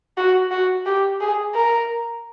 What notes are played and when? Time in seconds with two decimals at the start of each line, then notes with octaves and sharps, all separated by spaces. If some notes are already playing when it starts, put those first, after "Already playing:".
0.18 F#4
0.51 F#4
0.86 G4
1.20 G#4
1.55 A#4